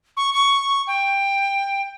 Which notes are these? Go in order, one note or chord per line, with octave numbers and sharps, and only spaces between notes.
C#6
C#6
G5